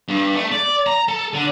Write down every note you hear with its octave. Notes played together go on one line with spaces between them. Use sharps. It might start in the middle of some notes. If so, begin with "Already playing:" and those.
G2
A3
D5
A#5
A4
D3